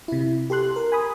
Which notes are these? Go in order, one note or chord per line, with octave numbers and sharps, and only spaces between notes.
C3 E4
G4 A4 C6 F#6
A#4
G#5 B5 D#6